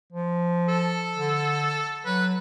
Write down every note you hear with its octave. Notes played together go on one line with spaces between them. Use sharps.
F3
A4
D3
F#3 B4